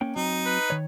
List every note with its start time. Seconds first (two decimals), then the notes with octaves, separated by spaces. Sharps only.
0.01 A#3 C#4 G5
0.16 F#3 C4 D#4
0.46 B4
0.70 D#3 C#5